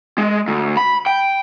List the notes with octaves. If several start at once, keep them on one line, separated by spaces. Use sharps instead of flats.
G#3
D2
B5
G5